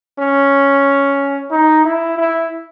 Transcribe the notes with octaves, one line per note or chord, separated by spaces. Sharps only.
C#4
D#4
E4
E4